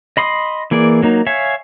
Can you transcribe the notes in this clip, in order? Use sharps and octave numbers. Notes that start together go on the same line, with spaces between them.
D#5 B5 C6 D#6
E3 A#3 G#4 D5
F#3 A#3 D#4
C#5 E5 F5 G#5